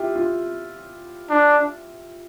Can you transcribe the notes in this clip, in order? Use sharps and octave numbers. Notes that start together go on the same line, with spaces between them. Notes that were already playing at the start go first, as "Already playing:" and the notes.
Already playing: E4 F4 G4
F4
D4